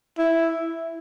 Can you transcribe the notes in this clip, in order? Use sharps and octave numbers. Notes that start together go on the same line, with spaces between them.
E4